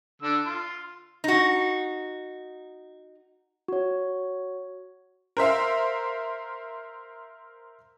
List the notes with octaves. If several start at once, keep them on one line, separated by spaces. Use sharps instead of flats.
D3 D4 E6
F4 C6
D#4 F#4
F#4 C#5
A#4 C5 E5 F5